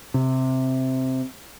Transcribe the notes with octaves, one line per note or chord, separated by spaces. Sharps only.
C3